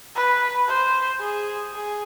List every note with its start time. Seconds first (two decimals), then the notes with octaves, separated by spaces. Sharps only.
0.16 B4
0.68 C5
1.21 G#4
1.73 G#4